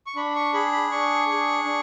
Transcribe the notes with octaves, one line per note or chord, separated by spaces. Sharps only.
C#6
D4 B5
C#6
G#4 B5
B5
D4 C#6
G#4
D4